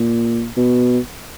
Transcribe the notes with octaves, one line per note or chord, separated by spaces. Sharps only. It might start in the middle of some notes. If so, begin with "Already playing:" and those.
Already playing: A#2
B2